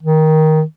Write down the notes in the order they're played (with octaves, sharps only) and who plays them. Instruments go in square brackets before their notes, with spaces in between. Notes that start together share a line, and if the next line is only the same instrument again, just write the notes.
[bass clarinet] D#3